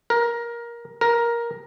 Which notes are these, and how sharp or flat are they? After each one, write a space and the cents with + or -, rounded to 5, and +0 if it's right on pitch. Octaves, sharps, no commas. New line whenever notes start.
A#4 +15
A#4 +10